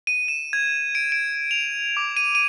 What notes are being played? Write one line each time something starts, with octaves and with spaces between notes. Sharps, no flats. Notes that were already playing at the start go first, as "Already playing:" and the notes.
D#7
E7
G#6
D7
D7
F7
D6
D#7
D#7